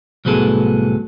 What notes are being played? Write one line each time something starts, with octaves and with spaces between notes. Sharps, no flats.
C2 A2 F#3 B3 G#4 A4